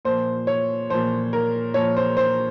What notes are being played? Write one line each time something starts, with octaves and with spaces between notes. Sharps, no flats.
A#2 F3 C5
C#5
A#2 F3 C5
A#4
A#2 F3 C#5
C5
C5